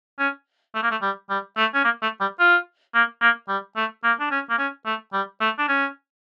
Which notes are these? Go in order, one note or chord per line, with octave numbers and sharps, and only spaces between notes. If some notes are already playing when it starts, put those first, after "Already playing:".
C#4
A3
A#3
A3
G3
G3
A3
C#4
A#3
A3
G3
F4
A#3
A#3
G3
A3
A#3
D4
C#4
A#3
C#4
A3
G3
A3
D4
C#4